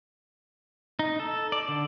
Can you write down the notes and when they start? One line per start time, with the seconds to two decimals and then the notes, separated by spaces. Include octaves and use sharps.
0.99 D#4
1.20 A4
1.52 D5
1.68 D3